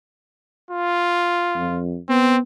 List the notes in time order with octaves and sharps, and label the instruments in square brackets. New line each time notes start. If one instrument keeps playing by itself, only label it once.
[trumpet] F4
[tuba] F2
[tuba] B3 [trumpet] C4